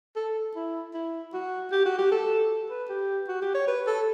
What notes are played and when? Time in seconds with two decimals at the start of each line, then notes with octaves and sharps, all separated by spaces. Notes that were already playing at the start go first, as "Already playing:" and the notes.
0.16 A4
0.56 E4
0.94 E4
1.33 F#4
1.72 G4
1.86 F#4
1.98 G4
2.12 A4
2.70 B4
2.89 G4
3.29 F#4
3.42 G4
3.55 C#5
3.68 B4
3.87 A4